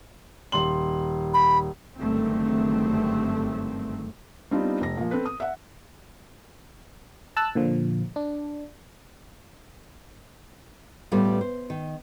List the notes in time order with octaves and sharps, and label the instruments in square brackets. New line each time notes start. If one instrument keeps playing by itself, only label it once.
[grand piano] D#1 C6 F#7
[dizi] B5
[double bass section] F#1 G2 D3 D#3 A3 C4
[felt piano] G3 B3 C4 D4 D#4 F4
F1 A#6
A#2 F3
C4 A4 B4
D#6
E5 F#5
[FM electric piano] A5 E6 F#6
A#2 D3 F3
D4
[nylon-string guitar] A2 G3 A3 B3 F4
C5
D#3